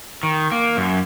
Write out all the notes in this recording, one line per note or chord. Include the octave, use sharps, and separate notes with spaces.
D#3
A#3
F#2